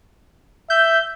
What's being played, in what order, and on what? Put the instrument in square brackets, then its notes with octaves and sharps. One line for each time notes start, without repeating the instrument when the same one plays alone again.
[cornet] E5 [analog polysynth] G6